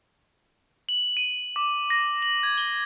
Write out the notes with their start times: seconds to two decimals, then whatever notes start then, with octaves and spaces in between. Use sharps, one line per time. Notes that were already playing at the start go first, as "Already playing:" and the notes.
0.89 F#7
1.17 D#7
1.56 D6
1.90 A#6
2.22 F#7
2.43 G#6
2.58 G7